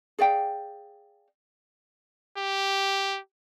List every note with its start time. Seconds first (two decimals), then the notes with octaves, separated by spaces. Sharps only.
0.19 G#4 D5 F5 G5
2.37 G4